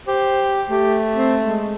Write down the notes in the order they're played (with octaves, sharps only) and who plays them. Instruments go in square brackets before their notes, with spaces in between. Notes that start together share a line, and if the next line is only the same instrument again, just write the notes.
[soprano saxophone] G4 [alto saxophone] C5
[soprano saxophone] A3 [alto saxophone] G4
[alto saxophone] C4
G#3